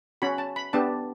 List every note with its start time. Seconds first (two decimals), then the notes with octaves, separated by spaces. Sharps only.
0.22 C#4 F#4 B5
0.38 A5
0.56 B5
0.73 B3 D4 G4 A5